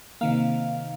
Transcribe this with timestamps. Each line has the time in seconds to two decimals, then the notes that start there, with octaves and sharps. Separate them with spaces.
0.21 C3 D#3 A#3 F5